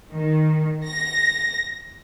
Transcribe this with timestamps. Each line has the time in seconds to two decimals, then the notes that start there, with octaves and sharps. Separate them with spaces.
0.12 D#3
0.86 A#6